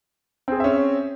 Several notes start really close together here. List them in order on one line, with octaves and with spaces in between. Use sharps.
C4 G#4 C5 E5 C#4